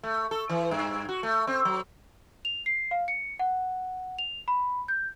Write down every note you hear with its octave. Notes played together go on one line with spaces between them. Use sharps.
A3
A4
E3
G2
F#4
A3
C4
F#3
F7
C7
F5
C#7
F#5
F7
B5
G6